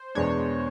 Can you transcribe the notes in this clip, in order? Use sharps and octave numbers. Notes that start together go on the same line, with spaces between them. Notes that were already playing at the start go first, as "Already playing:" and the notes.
Already playing: C5
E2 B2 G#3 B3 D4 C#5